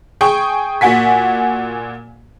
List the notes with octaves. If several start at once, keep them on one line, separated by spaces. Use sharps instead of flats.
G#4 G5 C#6
A#2 F#4 F#5 G#5 B6